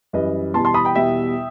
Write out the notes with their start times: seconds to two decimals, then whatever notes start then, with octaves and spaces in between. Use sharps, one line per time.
0.13 F#2 E3 G3 B4 D#5
0.54 E2 B2 G3 A5 C6
0.65 A5 C6
0.74 B5 D#6
0.85 G5 B5
0.95 E2 B2 G3 E5 G5